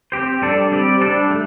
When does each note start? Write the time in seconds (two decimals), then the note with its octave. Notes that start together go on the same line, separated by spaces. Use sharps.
0.12 C4 G4 C5
0.42 G3 D4 A4 D5
0.72 G3 C4 G4 D5
1.01 G3 D4 A4 D5
1.31 A3